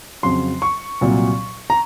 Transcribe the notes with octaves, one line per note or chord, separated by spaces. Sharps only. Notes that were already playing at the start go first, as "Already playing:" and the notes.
F2 C#3 F#3 C6
C#6
C2 A#2 F#3
A#5